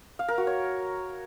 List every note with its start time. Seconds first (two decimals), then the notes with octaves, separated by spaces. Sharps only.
0.19 F5
0.28 A#4
0.38 F#4
0.47 C#5